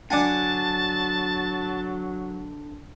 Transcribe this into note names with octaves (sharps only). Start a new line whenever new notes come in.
D3 F#3 D4 F#5 G#5 A5